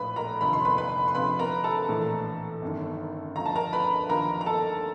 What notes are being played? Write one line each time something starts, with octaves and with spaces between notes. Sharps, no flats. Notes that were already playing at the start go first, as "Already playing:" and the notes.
Already playing: A#1 A2 F3 B4 B5
A#4 A#5
F1 D#2 D3 F3 B5
C6
B4 B5
B4 B5
C6
D2 C3 F3 B4 B5
A#4 A#5
A4 A5
A#1 A2 E3
G1 F#2 D#3
D2 D3 F3 A#5
A5
A#4 A#5
B4 B5
D#2 D3 F3 A#4 A#5
A#5
A4 A5